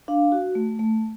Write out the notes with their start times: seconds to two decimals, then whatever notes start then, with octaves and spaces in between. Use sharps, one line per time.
0.08 D4 F5
0.32 F#4
0.55 A3
0.79 A3